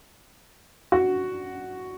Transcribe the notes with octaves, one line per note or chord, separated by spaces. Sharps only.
F#4